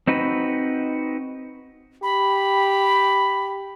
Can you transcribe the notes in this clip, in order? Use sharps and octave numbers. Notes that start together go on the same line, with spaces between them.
C4 D#4 F#4 B4
G4 B5